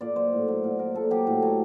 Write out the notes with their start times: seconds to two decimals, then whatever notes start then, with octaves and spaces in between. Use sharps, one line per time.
0.01 A#2 D5
0.16 F#3 C5
0.33 A2
0.48 F#3
0.64 A#2
0.79 F#3 A#4
0.94 A#2 A4
1.11 F#3 G4
1.27 A2
1.42 F#3